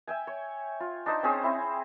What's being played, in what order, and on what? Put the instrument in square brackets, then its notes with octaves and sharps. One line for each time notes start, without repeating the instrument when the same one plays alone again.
[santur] E5 G5 G#5
C#5
F4
D4 D#4 C5
C4 C#4 G#4 C5
C4 E4